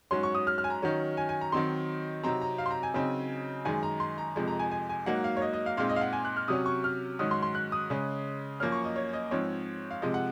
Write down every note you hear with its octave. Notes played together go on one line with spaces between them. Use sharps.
G#2 F#3 C#4 C6
C#6
D#6
F6
F6
G#5
A#5
D#3 F#3 C#4
G#5
G#5
A#5
D#3 F#3 C4 D#4 C6
C3 F#3 C4 D#4 A#5
A#5
F5
C6
A#5
G#5
C#3 F#3 C4 D#4
F#2 D#3 G#3 G#5
A#5
C6
A#5
F2 C3 F3 G#3
A#5
G#5
G#5
G#5
G#2 F#3 A#3 D#4 F#5
F5
C#5
D#5
D#5
F5
A#2 G#3 C4 D#4 F5
D#5
F5
F#5
G#5
F#6
F6
C3 F#3 C#4 D#6
C#6
F6
G#2 D#3 F#3 C#4 D#6
C6
C6
F#6
D#6
C#3 G#3 C#4
F#2 F3 A#3 C#4 F6
C#6
D#5
C#5
D#5
G#2 F3 C4 C#5
F5
C3 F3 G#3 D#5
F#5